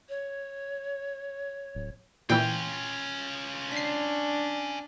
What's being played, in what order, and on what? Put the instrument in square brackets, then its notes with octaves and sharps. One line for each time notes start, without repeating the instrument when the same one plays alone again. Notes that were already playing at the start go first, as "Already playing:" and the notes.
[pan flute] C#5
[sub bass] D1
[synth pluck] A#2 E3 [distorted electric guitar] C#4 F4 [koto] G5
[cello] D4 [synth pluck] B6 C7